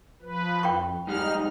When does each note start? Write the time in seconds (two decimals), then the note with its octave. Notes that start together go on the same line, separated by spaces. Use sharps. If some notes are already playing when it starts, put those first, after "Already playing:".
0.22 F3 B4
0.63 F2 G5 B5 C#6
1.07 G#2 G3 G#3 D#4 F6